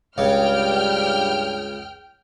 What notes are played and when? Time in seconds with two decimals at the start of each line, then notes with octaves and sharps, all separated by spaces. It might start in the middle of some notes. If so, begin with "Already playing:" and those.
0.18 C#2 G2 C#3 G3 G5 F6